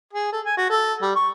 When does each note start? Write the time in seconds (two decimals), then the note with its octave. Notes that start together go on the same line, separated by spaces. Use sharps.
0.13 G#4
0.32 A4
0.45 G#5
0.57 F#4
0.70 A4
1.02 G3
1.15 C#6